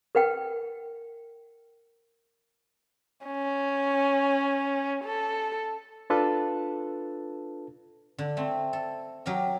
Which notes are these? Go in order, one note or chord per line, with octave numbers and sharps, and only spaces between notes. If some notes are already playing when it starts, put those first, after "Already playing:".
A#4 B4 F#5 G5
C#4
A4
D4 F4 A4 B4 A5
D3
A3 C4
A4
F#3 G4 A#4 D#5